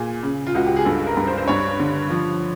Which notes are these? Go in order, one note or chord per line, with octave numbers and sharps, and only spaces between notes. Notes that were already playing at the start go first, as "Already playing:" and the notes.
Already playing: A#2 G#4
C#3
F4
C#2 F#4
G4
G#4
G2 A4
A#4
G2
C5
C5
G2 C#5
D3
F3